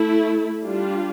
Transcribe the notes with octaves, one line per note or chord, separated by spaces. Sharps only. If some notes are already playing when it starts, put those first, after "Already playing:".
Already playing: A3 E4
G3 D4 F4